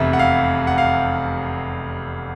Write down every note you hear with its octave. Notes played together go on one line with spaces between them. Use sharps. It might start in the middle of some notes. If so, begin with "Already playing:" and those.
Already playing: F1 E2 C3 E5
F#5
F5
F#5
F5